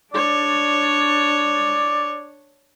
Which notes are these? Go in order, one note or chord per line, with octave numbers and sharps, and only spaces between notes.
D4 C#5 D5